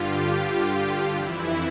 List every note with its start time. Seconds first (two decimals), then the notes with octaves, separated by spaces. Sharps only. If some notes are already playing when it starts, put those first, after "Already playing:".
Already playing: G2 D3 F4 G4
0.30 G4
1.15 F2 E3 E4